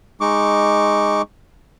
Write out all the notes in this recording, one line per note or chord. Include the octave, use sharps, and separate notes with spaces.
G#3 D#4 C#6 D6